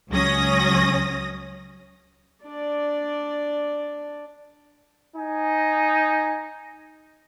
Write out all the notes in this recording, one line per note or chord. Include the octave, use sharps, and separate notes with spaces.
C#2 F#3 C#4 D#6 A#6
D4 D5
D#4 G#5